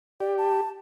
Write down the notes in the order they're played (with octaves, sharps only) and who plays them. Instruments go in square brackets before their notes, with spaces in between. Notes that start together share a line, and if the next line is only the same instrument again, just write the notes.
[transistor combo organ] G4 [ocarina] D5
[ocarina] A5